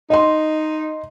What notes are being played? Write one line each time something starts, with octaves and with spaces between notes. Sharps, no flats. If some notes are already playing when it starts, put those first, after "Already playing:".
D#4 D#5 C6